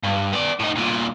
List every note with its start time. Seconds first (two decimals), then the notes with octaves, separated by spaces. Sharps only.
0.04 G2
0.33 B3 D5
0.60 A2 D#4
0.76 C2 A#2